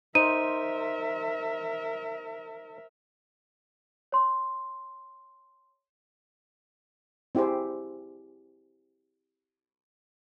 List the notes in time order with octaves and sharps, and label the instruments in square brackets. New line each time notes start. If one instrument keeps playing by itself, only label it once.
[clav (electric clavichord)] D#4 [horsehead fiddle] A#4 E5 [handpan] C5 [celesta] D#7
[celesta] C#5 C6
[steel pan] C4 E4 G4 G#4 C5